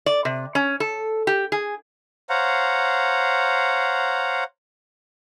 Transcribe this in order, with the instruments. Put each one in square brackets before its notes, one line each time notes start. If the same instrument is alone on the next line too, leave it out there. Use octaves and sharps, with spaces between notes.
[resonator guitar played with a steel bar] D5
C3
C#4
A4
G4
G#4
[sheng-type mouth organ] C5 C#5 F5 F#5 A#5